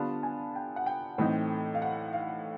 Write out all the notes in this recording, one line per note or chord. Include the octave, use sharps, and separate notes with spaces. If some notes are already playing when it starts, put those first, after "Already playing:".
Already playing: D3 G3 B3 D4 F4 A5
G#5
G5
F#5
G5
A2 E3 A3 C4 D#4
F5
F#5
F5